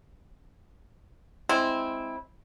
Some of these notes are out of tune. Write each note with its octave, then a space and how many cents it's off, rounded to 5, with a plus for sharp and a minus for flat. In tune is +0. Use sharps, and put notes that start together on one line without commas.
G#3 +0 C4 +0 E4 -10